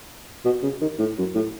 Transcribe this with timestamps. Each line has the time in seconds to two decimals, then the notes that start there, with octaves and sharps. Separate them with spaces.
0.45 B2
0.63 C#3
0.81 D#3
0.99 A2
1.18 F#2
1.35 A2